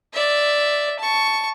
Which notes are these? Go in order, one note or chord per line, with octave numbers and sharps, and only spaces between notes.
D5 E5
A5 C#6